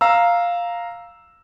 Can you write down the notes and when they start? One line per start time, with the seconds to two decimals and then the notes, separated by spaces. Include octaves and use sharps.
0.01 F5 A#5 E6